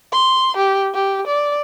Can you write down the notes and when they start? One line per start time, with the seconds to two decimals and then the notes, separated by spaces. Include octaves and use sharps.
0.13 C6
0.56 G4
0.94 G4
1.27 D5